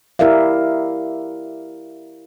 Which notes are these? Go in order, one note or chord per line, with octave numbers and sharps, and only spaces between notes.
E4 G4 A#4 D5 E5 F5